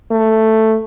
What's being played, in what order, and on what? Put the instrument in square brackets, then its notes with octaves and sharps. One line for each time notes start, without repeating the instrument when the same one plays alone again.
[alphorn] A3